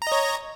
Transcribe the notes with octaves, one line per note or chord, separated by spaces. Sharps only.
C#5 D#5 A#5